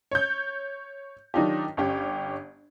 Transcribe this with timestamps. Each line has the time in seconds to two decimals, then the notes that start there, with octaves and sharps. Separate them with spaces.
0.11 C#5 G6
1.34 D#3 F#3 D4 D#4 F4 G4
1.77 G1 C#4 G4